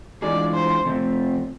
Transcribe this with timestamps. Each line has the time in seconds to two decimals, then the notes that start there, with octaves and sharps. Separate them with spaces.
0.22 E3 G#3 D4 F4 G#4 D5
0.54 C5
0.85 C3 F3 A3 C4